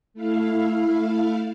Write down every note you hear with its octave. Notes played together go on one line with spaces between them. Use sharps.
A3 E4 F5